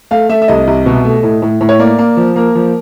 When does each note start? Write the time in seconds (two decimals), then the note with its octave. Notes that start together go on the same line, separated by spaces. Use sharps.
0.11 A3 F5
0.29 A3 E5
0.42 E5
0.48 C2 D#5
0.67 C2
0.86 B2
1.05 A3
1.23 A2
1.42 A2
1.61 A2
1.69 C#5
1.79 A#3 D5
1.99 A#3
2.17 F3
2.36 A#3 A#4
2.55 F3